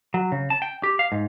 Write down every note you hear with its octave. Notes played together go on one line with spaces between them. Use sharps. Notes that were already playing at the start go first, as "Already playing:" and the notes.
F#3
C#3
A5
G5
G4
F5
G#2